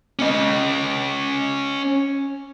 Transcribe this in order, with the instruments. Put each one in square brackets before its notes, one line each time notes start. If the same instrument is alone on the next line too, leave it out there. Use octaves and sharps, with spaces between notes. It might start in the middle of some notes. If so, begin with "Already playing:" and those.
[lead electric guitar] C#4 D#5